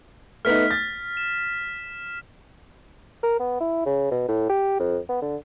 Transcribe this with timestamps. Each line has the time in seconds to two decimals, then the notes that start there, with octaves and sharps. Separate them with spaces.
0.45 A3 B3 D#4 F6 B6
0.71 A6
1.17 E7
3.23 A#4
3.40 B3
3.60 E4
3.86 C#3
4.11 B2
4.28 A2
4.49 G4
4.79 F2
5.09 B3
5.22 D3